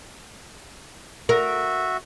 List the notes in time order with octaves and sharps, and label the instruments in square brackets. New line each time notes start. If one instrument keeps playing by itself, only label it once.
[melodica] F#4 E5 [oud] A#4